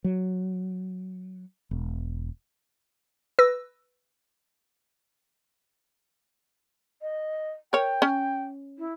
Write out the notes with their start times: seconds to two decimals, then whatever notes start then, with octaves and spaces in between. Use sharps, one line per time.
0.04 F#3
1.71 E1
3.39 B4 E6 A#6
7.02 D#5
7.73 A#4 C#5 G5
8.02 C#4
8.78 E4